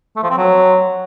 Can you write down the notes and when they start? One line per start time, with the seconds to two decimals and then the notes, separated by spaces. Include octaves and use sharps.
0.16 A3
0.23 F3
0.30 C4
0.37 F#3